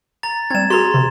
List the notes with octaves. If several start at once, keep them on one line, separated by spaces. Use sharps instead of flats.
A#5 A6
G3 C4 G#6 E7
F#4 G#4 A#5 C6
C3